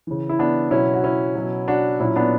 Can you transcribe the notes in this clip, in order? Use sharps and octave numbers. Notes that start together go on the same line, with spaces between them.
C#3 E3
E4
B3 D4
B2 F#3 C#4 E4
F#4
C#4 E4
B2 F#3
D4 F#4
A#2 F#3 C#4 E4
B3 D4